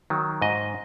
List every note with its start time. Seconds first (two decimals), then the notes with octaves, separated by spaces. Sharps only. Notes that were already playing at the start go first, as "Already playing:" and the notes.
0.10 D#3 F#3
0.42 G#2 D#5